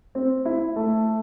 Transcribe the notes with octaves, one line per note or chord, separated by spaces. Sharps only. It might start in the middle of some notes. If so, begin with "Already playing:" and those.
C4
E4
A3